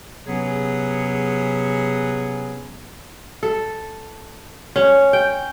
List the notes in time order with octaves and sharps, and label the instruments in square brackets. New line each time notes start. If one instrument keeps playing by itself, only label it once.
[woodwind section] C3 F#3 B3 C#4 G#4
[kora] A4
C#4
G5